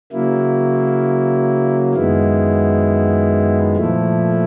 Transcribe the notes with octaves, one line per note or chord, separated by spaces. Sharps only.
C#3 F#3 A#3 E4
F#2 D#3 G#3 B3 E4
A#2 F3 A3 E4